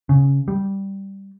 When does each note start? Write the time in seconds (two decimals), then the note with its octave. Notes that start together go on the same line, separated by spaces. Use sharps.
0.09 C#3
0.48 G3